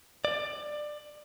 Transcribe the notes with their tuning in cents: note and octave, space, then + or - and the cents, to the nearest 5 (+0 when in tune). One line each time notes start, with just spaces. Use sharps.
D5 +20